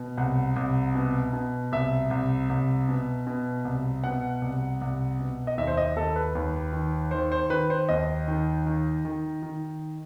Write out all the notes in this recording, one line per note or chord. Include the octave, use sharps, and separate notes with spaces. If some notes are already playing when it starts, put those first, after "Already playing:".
Already playing: B2
C2 F#5
C2
B2
B2
C2 E5
C2
C2
B2
B2
C2
B2 F#5
C2
C2
B2
D#5
D#2 E5
C5
D#5
D#2 A4
B4
D#2
D#3
D#3 C5
C5
D#3 B4
C5
D#2 D#5
D#3
D#3
D#3
D#3